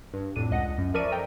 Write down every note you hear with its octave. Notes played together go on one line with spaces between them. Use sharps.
G2
F2 A2 D4 D#7
C#2 D#5 F#5
F#2
F3 A#4 D5 E5 C#6 D#7
A4 D#5 G5 A#5